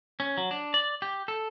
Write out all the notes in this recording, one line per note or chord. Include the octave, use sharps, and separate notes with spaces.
C#4
F#3
D4
D5
G4
A4